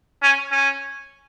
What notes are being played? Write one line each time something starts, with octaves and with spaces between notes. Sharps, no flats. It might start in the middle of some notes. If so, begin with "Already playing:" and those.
C#4
C#4